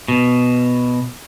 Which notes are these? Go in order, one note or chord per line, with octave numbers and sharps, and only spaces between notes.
B2